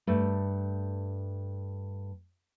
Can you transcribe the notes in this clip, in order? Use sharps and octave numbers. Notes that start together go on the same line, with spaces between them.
G2 A3